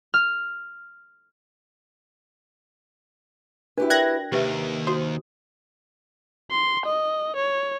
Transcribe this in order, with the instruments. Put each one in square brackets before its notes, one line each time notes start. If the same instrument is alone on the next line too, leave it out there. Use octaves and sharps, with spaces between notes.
[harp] F6
[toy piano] D4 F#4 [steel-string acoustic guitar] E4 G4 B4
[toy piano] A#4 D5 G5 [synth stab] F#6 G#6 A#6
[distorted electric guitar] D#2 D#3 [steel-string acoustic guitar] C3 [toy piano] G4 B4 E5
[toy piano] F#4 D#6 [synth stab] C5
[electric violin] C6
D#5
C#5